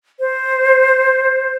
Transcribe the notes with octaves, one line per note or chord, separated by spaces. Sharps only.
C5